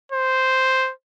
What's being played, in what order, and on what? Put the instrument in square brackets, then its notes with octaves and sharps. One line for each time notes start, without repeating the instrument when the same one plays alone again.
[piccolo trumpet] C5